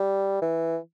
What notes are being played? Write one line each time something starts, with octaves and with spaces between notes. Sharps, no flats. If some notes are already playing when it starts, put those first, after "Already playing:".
Already playing: G3
E3